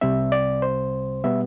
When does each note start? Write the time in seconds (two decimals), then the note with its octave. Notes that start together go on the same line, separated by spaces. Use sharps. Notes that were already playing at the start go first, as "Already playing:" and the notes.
0.01 C2 C3 G3 C4 E5
0.32 D5
0.62 C5
1.24 B2 G3 B3 E5